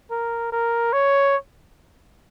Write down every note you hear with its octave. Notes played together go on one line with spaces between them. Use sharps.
A#4
A#4
C#5